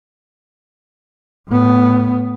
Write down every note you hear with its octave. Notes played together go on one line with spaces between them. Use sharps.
A2 B3